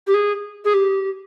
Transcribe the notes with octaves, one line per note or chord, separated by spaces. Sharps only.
G4
G#4
G#4
G4